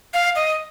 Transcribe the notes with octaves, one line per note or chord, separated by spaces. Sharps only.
F5
D#5